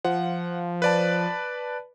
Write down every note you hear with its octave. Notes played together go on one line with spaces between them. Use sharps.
F3 F#5
B4 D5 A5